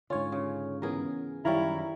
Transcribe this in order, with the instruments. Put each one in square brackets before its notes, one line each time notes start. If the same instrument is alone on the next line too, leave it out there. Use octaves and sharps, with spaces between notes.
[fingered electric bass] G#2 D3 [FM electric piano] C#4 C#5 [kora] F4
[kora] C#3
[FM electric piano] E3 B3 C#4 [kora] G#4 A#4
[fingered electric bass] F#2 D#3 [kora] E3 G3 [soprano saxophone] E4 [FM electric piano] C#5 F5 A#5